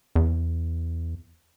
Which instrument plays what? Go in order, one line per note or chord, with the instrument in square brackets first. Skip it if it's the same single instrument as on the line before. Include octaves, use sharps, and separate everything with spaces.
[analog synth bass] E2